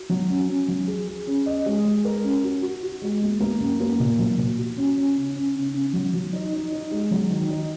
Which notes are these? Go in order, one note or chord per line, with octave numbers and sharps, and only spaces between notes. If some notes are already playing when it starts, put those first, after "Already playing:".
Already playing: F#4
F#3
C#4
C#4
F#3
G#4
G#4
C#4
D#5
G#3
G#3
A#4
C#4
F#4
F#4
F#4
G#3
A#3
A#3
F#2
A#3
A#2
F#3
A#2
F#4
C#4
C#4
C#3
C#4
C#3
C#3
F#3
F#3
D#4
D#4
D#4
G#3
F#3
D#3
D#4